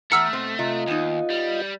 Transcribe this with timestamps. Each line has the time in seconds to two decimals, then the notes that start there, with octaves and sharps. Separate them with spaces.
0.12 E2 A3 F#5 A#5 E6 F6 C#7
0.33 B2 C4
0.59 C3 F4 D#5
0.88 D#2 B3 D#4
1.30 G3